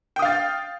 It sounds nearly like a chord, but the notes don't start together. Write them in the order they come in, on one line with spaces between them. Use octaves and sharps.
G5 D#6 F5 A6